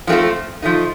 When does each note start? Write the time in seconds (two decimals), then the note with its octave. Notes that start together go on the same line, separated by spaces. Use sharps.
0.07 F3 A3 C4 F4 A4
0.62 F3 A3 D#4